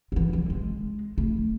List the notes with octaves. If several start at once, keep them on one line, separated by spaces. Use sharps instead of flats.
D3
E3
D3
G#3
A3